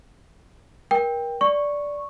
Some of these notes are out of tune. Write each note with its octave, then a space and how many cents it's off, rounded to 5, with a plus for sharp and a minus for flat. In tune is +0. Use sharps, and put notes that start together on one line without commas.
A#4 +30 G5 +15
D5 -10 C#6 -5